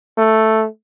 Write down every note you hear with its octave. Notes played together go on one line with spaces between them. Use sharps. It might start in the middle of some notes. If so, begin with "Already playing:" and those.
A3